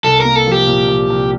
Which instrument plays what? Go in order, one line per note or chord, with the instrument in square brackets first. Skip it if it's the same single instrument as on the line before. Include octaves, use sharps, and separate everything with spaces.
[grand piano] C2 [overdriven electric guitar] A4
[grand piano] A#3 [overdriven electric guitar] A#4
[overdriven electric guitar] A4
[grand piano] F3 [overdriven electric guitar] G4
[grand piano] A#2
C2
C2